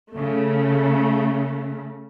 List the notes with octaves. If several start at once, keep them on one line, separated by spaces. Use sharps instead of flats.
C#3 A3